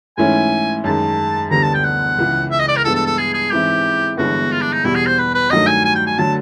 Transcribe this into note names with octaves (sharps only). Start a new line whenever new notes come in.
G#2 E3 A3 C#4 E4 G#5
F#2 D#3 G#3 A5
E1 D2 D3 G3 B3 A#5
A5
G5
F#5
C#2 C#3 E3
E5
D#5
D5
A#4
G2 E3 G#3 B3 A4
A4
A4
G#4
G#4
G#2 E3 G#3 C4 E4 G4
G1 G2 E3 G#3 B3 F#4
F4
D4
D#4
E2 B2 G3 E4
G#4
C5
B4
B4
G2 D#3 F#3 A3 D#5
G#5
G#5
G5
G#5
D3 F#3 A3 A5